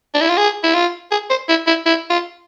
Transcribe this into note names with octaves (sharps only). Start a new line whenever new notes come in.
D4
E4
F4
G#4
E4
F4
G#4
C5
E4
E4
E4
F4